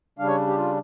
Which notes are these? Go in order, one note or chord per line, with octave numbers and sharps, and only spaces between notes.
C#3 G3 D4 F5
C#5
G4
F4